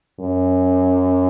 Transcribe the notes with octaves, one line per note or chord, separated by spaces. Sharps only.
F#2